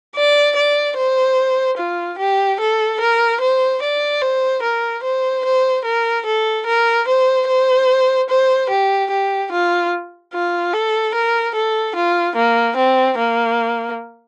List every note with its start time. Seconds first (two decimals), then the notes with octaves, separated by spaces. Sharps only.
0.16 D5
0.56 D5
0.97 C5
1.78 F4
2.19 G4
2.60 A4
3.00 A#4
3.41 C5
3.82 D5
4.22 C5
4.63 A#4
5.03 C5
5.45 C5
5.85 A#4
6.26 A4
6.66 A#4
7.08 C5
7.48 C5
8.30 C5
8.70 G4
9.10 G4
9.52 F4
10.33 F4
10.73 A4
11.15 A#4
11.55 A4
11.95 F4
12.36 A#3
12.76 C4
13.18 A#3